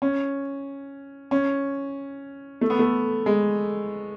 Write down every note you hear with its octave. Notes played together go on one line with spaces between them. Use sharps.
C#4
C#4
A3
B3
A3
G#3